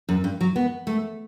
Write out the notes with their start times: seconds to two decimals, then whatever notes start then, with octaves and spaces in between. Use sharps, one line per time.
0.09 F#2
0.24 G2
0.41 F#3
0.56 B3
0.87 A3